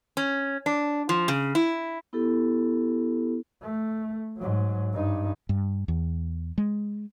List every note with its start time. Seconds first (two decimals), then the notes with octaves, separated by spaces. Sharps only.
0.17 C#4
0.66 D4
1.09 F3
1.28 C#3
1.55 E4
2.13 B3 E4 G4 A4
3.62 A3
4.38 G#2 F#3
4.93 G2 D#4
5.49 G2
5.88 E2
6.58 G#3